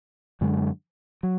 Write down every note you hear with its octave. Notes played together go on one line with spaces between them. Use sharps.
F#2 D3 G#3
F#3